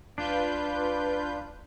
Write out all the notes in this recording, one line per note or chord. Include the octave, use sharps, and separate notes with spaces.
C2 D4 F4 B4 G6